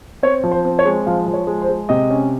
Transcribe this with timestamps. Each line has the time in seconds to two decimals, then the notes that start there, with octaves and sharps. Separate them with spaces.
0.23 C4 C#5
0.44 F3
0.51 C5
0.65 C4
0.79 C#5
0.85 G#3
1.06 F3 F5
1.26 F3
1.34 C#5
1.47 G#3
1.62 C5
1.69 G#3
1.89 C3 D#5
2.10 C#4